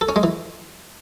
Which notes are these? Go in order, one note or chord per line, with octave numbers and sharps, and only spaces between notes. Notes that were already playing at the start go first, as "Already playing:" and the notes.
A4
C#4
G#3
E3